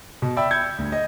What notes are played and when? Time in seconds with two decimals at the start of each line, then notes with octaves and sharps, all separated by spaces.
0.22 B2
0.37 D5 E5 G5 B5 E6
0.51 G6 G#6 C#7
0.78 D2
0.92 D#5